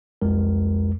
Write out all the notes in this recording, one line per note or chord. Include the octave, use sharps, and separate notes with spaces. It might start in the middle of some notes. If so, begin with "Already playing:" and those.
C2 F2 G#3 A#4